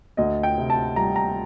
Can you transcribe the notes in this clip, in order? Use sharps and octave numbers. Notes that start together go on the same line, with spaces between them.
D2 D#5
G5
C3
A5
G3 A#5
A#5